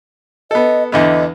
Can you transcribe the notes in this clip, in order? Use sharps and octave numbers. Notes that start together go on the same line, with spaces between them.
B3 A4 D#5
E2 D3 B3 D#5